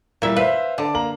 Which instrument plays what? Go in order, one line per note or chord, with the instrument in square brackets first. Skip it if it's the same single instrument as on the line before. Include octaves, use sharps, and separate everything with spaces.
[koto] A#2 E5 [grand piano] G3 E4
[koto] B4 [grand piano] C5 E5 F5
[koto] D3 [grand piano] D5 A5 D6
[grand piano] A#3 A#5 F#7